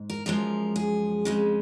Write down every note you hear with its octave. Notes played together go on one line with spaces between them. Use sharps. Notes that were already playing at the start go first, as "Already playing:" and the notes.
Already playing: G#2
A#4
F#2 F3 G#3 A#4
G#4
F2 C#3 G#3